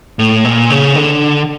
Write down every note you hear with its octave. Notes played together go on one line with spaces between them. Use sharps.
A2
A#2
C#3
D3